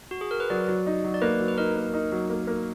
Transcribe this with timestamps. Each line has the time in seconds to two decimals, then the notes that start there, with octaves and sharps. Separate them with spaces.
0.11 F#4
0.21 G#4
0.31 A#4
0.40 B4
0.50 F#3 D5
0.68 F#3
0.86 D#4
1.04 F#3
1.14 D5
1.22 A#3 B4
1.40 F#3
1.48 B4
1.58 D#4 A#4
1.76 A#3
1.94 D#4
2.12 F#3
2.30 A#3
2.47 A#3